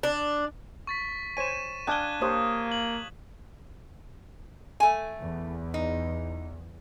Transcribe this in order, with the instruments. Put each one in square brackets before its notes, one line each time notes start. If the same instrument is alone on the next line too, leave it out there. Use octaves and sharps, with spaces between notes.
[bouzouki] D4
[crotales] C#6 A6 B6
[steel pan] C5 C#5 G#5 [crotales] D#7 E7
[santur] D4 F5 [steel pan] G5 G#5 D#6 [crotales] F#6 G#6 G7
[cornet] A#3 [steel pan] G4 C5 C#5 [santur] D#6
[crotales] F#7
[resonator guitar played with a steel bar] A3 G#5
[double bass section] E2
[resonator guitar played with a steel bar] D#4